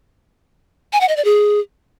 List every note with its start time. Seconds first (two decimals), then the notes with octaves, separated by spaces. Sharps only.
0.93 G#5
1.01 F#5
1.09 D#5
1.17 D5
1.25 G#4